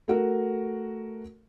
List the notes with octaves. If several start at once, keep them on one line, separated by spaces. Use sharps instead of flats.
A3 F#4 A#4